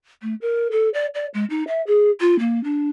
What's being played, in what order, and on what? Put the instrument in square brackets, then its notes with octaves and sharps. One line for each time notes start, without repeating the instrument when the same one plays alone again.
[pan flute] A3
A#4
A4
D5
D5
G#3
D#4
E5
G#4
F4
A#3
D4